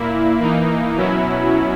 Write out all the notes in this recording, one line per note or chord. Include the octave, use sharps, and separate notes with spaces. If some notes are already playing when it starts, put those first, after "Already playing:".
Already playing: A#2 A#3 E4
E3 A#3 D#4
B2 F#3 C#4 E4